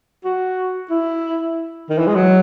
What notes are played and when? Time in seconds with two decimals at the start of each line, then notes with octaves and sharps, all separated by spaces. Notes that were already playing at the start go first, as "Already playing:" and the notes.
0.25 F#4
0.90 E4
1.90 D#3
1.98 E3
2.07 G#3
2.15 F#3